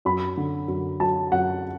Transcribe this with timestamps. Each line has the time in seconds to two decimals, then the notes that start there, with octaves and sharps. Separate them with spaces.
0.05 F#2 B5
0.37 D3
0.68 F#2
1.00 F#3 A5
1.32 F#2 F#5